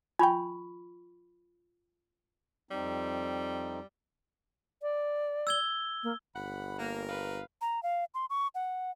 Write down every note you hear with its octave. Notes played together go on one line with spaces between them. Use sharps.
F4 G5 G#5 B5 C#6
F2 G3 C4 D#4
D5
E6 G#6 G7
A#3
G1 F#5 B5
A#3 A#4
B4 F5
A#5
F5
C6
C#6
F#5